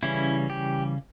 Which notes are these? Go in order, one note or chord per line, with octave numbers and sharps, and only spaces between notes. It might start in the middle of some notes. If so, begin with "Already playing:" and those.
C#3 E3 G3 C#4 E4
G4